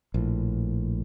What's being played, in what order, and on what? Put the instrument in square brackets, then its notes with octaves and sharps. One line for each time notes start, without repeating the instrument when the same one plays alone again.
[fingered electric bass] A#1 A2